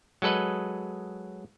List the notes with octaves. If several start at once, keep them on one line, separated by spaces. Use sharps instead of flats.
F#3 G#3 A4 B4 D#5